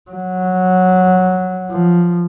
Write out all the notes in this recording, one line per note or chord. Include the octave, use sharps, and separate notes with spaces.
F#3
F3